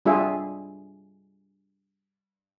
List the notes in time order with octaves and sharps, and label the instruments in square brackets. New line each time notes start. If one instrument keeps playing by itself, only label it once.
[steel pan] G3 D4 F4 G#4 E5